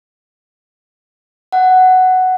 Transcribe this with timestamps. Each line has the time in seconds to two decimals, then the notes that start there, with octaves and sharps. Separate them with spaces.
1.52 F#5